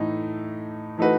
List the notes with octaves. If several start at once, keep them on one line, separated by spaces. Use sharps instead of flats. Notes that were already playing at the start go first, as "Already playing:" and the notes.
Already playing: A2 E3 A3 D#4
E3 A3 D#4 F#4 B4